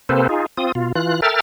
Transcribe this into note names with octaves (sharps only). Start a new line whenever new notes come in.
C3 A#3 C4 A4 B4 C5
D#4 F4 G#4
C4 F4 D#6
B2 F4
E3 F4 F#6
A4 A#4 E5 G5 F6 A6